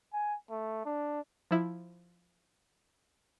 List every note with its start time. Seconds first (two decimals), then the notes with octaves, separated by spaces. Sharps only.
0.13 G#5
0.50 A3
0.85 D4
1.51 F3 E4